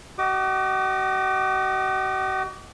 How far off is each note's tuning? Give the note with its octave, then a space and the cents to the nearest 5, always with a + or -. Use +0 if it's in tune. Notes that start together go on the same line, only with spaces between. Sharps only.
F#4 +45 D#5 +0 D6 +30